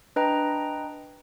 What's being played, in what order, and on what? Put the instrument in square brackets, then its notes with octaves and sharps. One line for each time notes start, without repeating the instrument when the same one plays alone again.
[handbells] D4 B4 D#5 G5 A#5